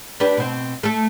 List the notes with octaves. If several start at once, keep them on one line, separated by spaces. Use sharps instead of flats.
D4 G4 B4
B2 C4
A3 A4